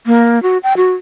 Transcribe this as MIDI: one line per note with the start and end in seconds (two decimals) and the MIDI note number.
0.06 0.42 58
0.43 0.58 66
0.63 0.73 79
0.77 0.93 66